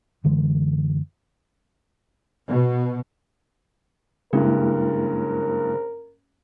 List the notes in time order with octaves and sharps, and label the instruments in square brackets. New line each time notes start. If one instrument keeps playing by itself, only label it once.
[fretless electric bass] F#2 D3 E3 G#3
[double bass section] B2
[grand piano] F#1 G2 [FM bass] C#3 [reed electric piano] G#3 A#3 E4 [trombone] A#4